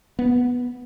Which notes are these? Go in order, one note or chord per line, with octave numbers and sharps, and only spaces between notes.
B3